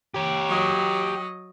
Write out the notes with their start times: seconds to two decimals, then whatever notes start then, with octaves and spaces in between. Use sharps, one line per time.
0.14 G4 C#5
0.49 F#3 D#5